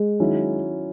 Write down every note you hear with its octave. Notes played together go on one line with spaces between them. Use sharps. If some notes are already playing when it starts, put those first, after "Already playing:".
Already playing: G#3
D#3 F#3 C#4 E4